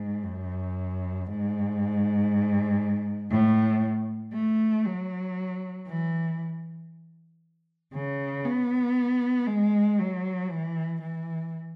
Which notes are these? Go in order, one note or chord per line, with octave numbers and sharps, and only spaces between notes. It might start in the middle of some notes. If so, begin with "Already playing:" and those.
Already playing: G#2
F#2
G#2
A2
A3
F#3
E3
C#3
B3
G#3
F#3
E3
E3